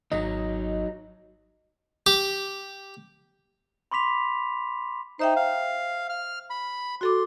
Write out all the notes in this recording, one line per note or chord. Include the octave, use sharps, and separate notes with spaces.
G#1 F#3 D#4 D#5
G4
B5 C6 D6 B6 F7
D#4 C5 E5 G5
F5
F6
B5
F#4 A4 C6 D6